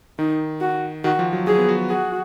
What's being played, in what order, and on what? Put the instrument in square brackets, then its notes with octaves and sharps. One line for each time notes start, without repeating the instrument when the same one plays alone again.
[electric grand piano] D#3 [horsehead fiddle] D#4
[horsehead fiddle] F#4
[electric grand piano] D#3 [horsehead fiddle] F#4
[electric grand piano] F3
F#3
[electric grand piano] F#3 [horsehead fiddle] G#4
[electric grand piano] B3
F#4
[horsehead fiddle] F#4 [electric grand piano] G#4